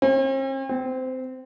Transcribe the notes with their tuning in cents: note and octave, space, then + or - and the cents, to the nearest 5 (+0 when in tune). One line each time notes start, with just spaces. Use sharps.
C4 +45
C4 -20